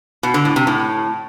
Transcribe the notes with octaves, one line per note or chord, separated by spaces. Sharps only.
B2
D3
A2
C3
A2